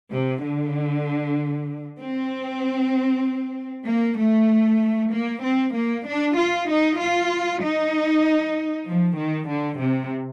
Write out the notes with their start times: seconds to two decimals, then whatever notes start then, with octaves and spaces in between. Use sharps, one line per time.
0.12 C3
0.43 D3
1.99 C4
3.87 A#3
4.18 A3
5.12 A#3
5.44 C4
5.75 A#3
6.06 D4
6.38 F4
6.69 D#4
7.00 F4
7.62 D#4
8.88 F3
9.19 D#3
9.50 D3
9.81 C3